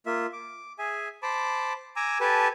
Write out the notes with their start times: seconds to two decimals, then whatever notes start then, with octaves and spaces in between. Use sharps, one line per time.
0.06 A#3 F4 E5
0.33 D6
0.79 G#4 E5 G#5
1.23 C5 A5 B5 D6
1.96 G#5 A#5 D6 E6
2.20 G4 A4 B4 G#5 A5